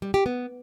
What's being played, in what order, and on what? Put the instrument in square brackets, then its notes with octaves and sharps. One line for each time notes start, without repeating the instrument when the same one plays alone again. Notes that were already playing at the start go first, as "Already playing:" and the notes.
[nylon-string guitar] G3
G4
B3